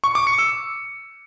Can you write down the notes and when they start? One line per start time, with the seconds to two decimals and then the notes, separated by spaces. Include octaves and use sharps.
0.04 C#6
0.15 D6
0.27 C#7
0.39 E6